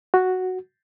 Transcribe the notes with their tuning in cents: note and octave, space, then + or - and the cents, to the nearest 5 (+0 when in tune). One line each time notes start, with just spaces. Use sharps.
F#4 +0